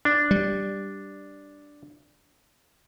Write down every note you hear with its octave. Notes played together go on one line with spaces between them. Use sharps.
D4
G3